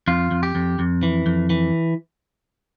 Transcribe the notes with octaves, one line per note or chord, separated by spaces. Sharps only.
F2 F4
F2
G4
F2
F2
E3
F2
E3